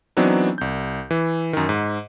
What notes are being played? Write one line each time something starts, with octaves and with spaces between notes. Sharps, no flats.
E3 F#3 B3 C4 D4 D#4
C2 G6
E3
F#2 D#3
G#2